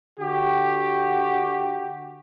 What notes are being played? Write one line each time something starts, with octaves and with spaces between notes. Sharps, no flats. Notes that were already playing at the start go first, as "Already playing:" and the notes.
D3 F#4 G4